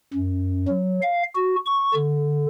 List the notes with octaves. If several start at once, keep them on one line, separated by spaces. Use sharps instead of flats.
F#2
F#3
F5
F#4
C#6
D3